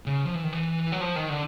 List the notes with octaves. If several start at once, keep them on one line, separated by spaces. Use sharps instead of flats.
C#3
F3
E3
D#3
E3
F#3
F3
D#3
D3